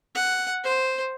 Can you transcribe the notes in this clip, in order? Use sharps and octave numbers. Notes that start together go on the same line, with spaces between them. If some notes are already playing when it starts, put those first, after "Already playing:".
F#5
C5